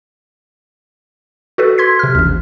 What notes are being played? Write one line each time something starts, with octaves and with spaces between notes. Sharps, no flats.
F#4 A4 B4
C6 G#6 B6
C3 F6
A1 D#2